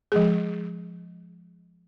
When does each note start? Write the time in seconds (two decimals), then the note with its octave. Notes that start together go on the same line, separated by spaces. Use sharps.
0.12 F3 G#3 G#4